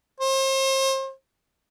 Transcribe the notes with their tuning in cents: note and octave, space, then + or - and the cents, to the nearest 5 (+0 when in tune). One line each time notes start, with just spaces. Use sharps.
C5 +35